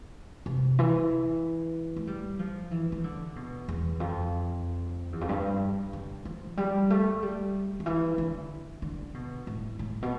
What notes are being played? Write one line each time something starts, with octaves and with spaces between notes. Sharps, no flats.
C3
E3
A3
G3
F3
E3
E3
D3
B2
E2
F2
E2
F2
G2
D3
F3
G3
A3
G3
D3
E3
D3
D3
B2
A2
A2
B2